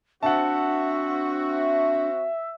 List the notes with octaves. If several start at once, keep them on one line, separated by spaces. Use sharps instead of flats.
C4 D4 F#4 E5 F#5 A5